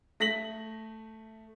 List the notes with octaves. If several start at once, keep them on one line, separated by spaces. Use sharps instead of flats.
A3 A#6 B6 F#7